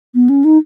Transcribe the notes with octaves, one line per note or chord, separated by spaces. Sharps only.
B3
C#4
D#4